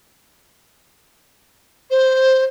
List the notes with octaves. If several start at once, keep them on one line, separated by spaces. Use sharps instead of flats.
C5